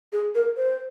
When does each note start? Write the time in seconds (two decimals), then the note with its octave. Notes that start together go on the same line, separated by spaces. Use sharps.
0.13 G#4
0.35 A#4
0.57 C5